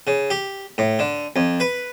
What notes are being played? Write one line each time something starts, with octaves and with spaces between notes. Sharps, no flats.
C#3
G4
A2
D3
F2
B4